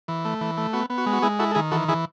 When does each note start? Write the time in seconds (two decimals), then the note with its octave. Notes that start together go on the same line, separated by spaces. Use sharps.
0.08 E3
0.25 A3
0.41 E3
0.57 A3
0.73 B3 F#4
0.90 B3
0.98 F#4
1.06 G#3
1.13 F#4
1.22 G#3 E4 G#4
1.39 E4 F#4 A4
1.51 A4
1.55 D#3 E4 G#4
1.71 E3 F#4 A4
1.88 E3 E4 G#4